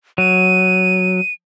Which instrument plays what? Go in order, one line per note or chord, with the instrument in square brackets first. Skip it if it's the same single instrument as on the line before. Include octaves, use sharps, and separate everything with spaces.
[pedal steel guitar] F#3 [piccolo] D#7